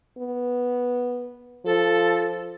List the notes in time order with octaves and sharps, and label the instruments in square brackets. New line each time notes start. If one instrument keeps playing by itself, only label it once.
[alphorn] B3
[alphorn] F3 [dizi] A4